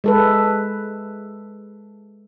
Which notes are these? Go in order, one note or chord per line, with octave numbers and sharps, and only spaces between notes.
G#3 A4 B4